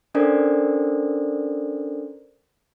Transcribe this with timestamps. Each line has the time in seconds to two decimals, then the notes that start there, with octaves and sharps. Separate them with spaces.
0.14 C#4 D4 A4 A#4 C5 D5